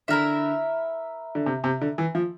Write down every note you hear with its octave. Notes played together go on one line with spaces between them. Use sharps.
D3 E4 A#4 E5
D3
C3
C3
D3
E3
F3